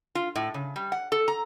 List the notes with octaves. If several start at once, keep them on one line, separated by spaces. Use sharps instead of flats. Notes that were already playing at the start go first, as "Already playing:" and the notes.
F4
A2
C#3
G3
F#5
A4
A#5